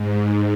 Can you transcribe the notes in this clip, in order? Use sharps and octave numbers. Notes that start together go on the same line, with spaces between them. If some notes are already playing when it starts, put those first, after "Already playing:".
Already playing: G#2